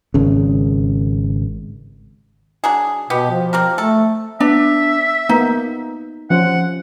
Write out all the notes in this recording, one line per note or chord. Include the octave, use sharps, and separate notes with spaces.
G#1 C#3
F#3 D4 G#4
B2 B3 G4
F3
C4 G4 A#4
A3 A4
B3 D4 E5
A#3 B3 D#4
F3 C#4 C5 F#5